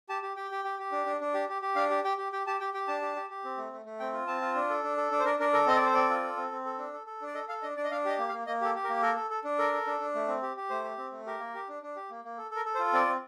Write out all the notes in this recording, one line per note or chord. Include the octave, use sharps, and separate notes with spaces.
G4 A5
G4
G4 G5
G4
G4
G4
D4
D4
D4
G4
G4
G4
D4 F5
G4
G4 G5
G4
G4 G5
G4 A5
G4 G5
G4 G5
D4 A5
G4
G4
G4
C4
A3
A3
A3
C4 G5
F4
C4 A5
F4
D4
A4
D4
A4
D4
C5
D4 A#4
D4 A#4
A4 A#4
C4 D#5
D5
A4 C5
C4 D5
F4
A4
C4
C4
A4
D4
A4
A4
D4
D5
A4 D#5
A4 F5
D4 D#5
D4 D5
D#5
D4 F5
G4 D#5
A#3
F5
A#3
A#3 D#5
G4 A4
G4
A#4
A#3
A4 A#4
A4
A4
D4
A4 A#4
A4
D4
D4
A3
C4
G4
G4
A3 C5
G4
C4
A3
G4 A#4
A#3
G4
D4
D4
G4
A#3
A#3
A4
A4 A#4
A4
C5
F4
C4 D5
C4